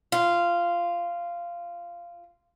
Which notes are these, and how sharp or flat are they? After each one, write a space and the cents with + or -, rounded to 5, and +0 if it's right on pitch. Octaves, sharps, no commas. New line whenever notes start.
F4 -15